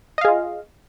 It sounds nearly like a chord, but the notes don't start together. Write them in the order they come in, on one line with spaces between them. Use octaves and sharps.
D#5 F5 G#4 F4